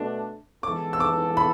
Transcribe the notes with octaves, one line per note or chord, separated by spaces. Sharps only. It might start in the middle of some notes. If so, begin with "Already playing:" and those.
Already playing: B2 A3 D4
E3 G#3 B3 E4 A4 D6
E6
D6
B5